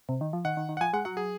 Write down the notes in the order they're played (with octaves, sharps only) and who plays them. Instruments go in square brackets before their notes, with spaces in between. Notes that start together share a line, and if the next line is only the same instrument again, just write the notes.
[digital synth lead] C3
D#3
F3
[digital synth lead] D#3 [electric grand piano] F#5
[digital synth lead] D#3
D#3
[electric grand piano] F#5
[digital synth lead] F3 [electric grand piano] G#5
[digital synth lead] G#3 [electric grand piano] F#5
[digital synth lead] F#3 [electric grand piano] F#5
[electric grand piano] G#4